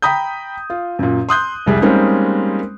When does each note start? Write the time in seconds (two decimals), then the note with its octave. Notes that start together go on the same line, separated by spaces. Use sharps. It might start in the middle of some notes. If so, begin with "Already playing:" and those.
0.02 G5 A#5 B5 D#6 G6
0.70 F4
0.99 F#2 A#2
1.29 C6 D#6 F#6 G6
1.66 F1 C2 G3 G#4
1.82 G3 G#3 A#3 C4 C#4 D#4